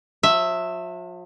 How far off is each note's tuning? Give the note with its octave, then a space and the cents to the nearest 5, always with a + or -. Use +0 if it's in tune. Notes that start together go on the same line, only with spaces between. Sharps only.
F3 +45 E5 +0